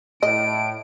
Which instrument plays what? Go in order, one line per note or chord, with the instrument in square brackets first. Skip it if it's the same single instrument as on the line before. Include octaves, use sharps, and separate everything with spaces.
[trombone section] A2 [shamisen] D#5 [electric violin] D7